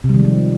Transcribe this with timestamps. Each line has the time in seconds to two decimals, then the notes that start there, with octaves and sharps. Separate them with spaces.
0.04 C3
0.09 G3
0.14 D#3
0.19 G#3
0.25 F3